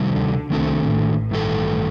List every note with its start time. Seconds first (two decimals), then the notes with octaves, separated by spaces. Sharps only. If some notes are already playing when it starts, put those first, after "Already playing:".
Already playing: C3 D#3 G3
0.09 D2 D3
0.50 C2 C3 D#3 A3 D4 A4
0.90 A1 A2
1.31 G2 D#3 A3 D4 A4